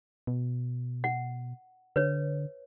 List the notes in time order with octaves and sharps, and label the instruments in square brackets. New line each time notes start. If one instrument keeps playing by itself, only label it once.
[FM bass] B2
[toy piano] F#5
[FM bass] D3 [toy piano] B4 C#5